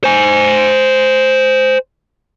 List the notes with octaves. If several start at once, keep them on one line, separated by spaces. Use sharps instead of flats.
C5 G#5